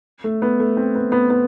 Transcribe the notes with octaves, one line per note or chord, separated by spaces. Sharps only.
A3
B3
A3
C4
B3
B3
B3